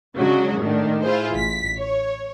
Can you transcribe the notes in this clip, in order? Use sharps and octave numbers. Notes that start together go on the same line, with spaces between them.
C#3 F#3 G#3 D4 F#4
A2 D#3 D4
E4 F4 G#4 C5
A1 B6
C#5